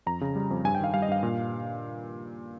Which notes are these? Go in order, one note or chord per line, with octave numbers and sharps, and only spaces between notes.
F2 A#5
C#3
G3
F2
G2 G#5
G5
D#3 F5
G3 F5
D#5
G2 F5
A#2